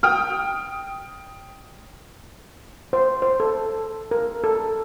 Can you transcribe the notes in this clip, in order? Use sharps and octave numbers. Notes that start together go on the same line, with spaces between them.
G5 D#6 F6
C5
C5
A4
A#4
A4